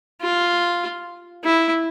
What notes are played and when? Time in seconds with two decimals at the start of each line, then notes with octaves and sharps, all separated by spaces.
0.21 F4
1.44 E4